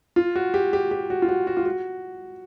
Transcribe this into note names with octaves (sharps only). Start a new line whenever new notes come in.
F4
F#4
G4
G4
G4
F#4
F4
F#4
F#4
F4
F#4